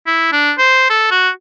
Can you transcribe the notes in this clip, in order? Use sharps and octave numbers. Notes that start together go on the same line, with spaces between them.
E4
D4
C5
A4
F#4